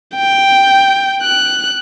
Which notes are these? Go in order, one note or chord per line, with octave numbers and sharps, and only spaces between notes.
G5
F#6